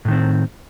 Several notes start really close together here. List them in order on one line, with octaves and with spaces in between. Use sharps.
A2 D#3 C4